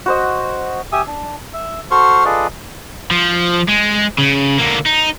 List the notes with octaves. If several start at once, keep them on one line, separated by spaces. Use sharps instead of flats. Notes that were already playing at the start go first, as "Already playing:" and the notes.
F#4 C5 D#5
G4 E5 G#5 D#6
D4
E5
F#4 A4 C5 C6 C#6 F6
F4 G#4 A4 B4 D5 D#5
F3
G#3
C#3
D3 A#3
D#4